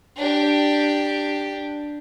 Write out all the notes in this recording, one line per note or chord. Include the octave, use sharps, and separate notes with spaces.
D4 G4